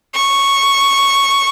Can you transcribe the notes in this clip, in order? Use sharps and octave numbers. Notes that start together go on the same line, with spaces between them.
C#6